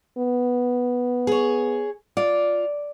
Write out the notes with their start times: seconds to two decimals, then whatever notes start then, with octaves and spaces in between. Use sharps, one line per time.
0.18 B3
1.27 G#4 C#5
2.17 F4 D5